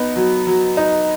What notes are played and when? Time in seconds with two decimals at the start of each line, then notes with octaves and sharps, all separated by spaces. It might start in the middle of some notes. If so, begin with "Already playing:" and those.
Already playing: B3 D#4
0.16 F#3
0.47 F#3
0.77 D#4